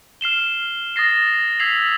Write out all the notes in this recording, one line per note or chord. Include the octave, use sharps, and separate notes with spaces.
F6 C7 E7 G7
D#6 A6 A#6 C7
E6 G#6 B6 C7 F7 F#7